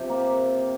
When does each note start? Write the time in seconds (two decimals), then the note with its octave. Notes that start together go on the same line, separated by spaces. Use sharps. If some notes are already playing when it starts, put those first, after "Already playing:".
Already playing: C3 F3 G4
0.09 A#3